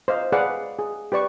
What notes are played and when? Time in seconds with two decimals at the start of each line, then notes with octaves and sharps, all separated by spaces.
0.08 C5 D#5 F5
0.32 G#4 B4 D5 F5 F#5
0.79 G#4
1.12 G4 B4 D5 C#6